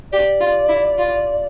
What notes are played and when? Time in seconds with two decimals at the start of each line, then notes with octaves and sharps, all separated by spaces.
0.12 G4 D5
0.40 F4
0.68 E4
0.98 F4